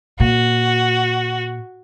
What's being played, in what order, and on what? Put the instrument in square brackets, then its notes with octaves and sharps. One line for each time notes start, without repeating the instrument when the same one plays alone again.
[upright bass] A#2 [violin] F#4